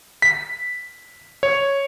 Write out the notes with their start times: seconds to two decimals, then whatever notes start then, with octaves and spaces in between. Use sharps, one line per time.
0.22 B6
1.43 C#5